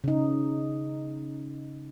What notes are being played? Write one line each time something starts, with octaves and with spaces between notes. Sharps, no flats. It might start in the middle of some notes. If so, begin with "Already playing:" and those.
C#3 D#4